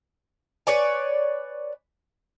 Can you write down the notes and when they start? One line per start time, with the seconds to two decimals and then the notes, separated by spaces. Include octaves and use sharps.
0.67 B4 C#5 D5 G#5